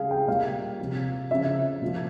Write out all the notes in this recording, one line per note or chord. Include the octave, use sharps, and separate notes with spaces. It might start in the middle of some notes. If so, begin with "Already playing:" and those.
Already playing: C#3 G3 G#4 F5
G5
A#2 G3 F5
C3 F3
C#3 F3 E5
A#2 F3